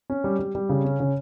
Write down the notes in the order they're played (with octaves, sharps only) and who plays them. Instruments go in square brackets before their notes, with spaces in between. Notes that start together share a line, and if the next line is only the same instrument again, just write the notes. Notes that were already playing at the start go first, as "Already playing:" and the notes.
[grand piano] C#4
G3
G3
G3
C#3
C#4
C#3